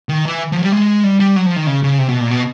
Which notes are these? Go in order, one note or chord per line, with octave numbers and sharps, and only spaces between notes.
D#3
E3
F3 F#3
G3
G#3
G3
G3
F#3
F3
D#3
C#3
C#3
C3
B2
A#2
B2